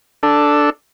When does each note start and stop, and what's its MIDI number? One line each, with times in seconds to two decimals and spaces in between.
0.23 0.70 62
0.23 0.70 69